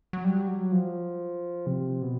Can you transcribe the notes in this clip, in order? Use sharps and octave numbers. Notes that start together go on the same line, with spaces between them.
F#3
G3
F#3
F3
C3
B2